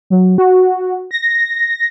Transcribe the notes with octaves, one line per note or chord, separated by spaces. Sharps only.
F#3
F#4
A#6